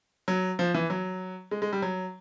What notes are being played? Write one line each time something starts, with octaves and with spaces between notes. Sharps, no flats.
F#3
F3
E3
F#3
G#3
G#3
G3
F#3